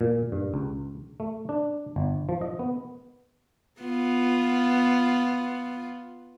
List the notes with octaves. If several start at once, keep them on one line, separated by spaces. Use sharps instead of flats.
A#2
G2
C#2
A3
D4
G1
F3
D#5
B3
B3 F4